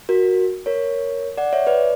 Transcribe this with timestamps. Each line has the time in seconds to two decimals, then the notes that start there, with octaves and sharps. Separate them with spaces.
0.09 F#4 A#4
0.66 A#4 C#5
1.37 D5 F#5
1.53 C#5 E5
1.67 B4 D5